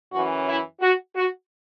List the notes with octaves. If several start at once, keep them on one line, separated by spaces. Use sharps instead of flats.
F#2 E3 C#4 F#4
E4
F#4
F#4